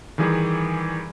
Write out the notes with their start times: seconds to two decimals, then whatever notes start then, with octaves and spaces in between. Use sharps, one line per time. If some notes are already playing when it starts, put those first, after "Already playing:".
0.18 D#3 E3 G3 G#4